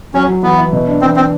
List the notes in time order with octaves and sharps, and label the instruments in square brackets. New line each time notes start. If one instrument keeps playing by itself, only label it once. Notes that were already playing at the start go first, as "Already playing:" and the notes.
[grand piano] F#3 [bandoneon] C#4
[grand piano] F#3
[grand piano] E3 [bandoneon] B3
[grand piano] E4
B2
D4
[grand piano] E3 [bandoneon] C4
[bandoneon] C4 [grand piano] E4